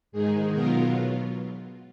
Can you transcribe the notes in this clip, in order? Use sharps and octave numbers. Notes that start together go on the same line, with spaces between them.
G#2 D#3 G#3 D#4 G#4
B2 F#3 B3 F4 A#4